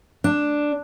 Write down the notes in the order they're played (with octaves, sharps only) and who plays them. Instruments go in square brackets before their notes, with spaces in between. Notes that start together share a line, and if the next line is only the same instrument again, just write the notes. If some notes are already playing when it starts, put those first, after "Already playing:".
[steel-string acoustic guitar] D4